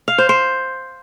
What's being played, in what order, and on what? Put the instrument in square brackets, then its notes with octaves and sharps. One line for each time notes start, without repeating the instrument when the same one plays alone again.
[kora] F5
C5
C5